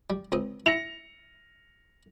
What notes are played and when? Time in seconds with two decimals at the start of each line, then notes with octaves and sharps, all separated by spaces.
0.10 G3
0.32 C#2 C4 D#6
0.66 E4 A#6 C#7 F7